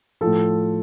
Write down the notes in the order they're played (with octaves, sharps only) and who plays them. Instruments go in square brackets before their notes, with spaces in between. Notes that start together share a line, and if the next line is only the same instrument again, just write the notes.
[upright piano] A2 F3 A4